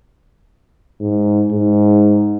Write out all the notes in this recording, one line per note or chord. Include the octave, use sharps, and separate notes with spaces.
G#2
G#2